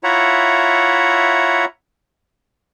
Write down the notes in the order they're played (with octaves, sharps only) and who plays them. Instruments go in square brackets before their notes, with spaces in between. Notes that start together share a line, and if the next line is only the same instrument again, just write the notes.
[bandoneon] E4 F4 C#5 E5 F#5 A#5